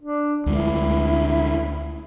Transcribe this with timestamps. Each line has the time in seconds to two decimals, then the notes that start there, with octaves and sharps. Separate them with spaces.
0.01 D4
0.46 D2 G#3 E4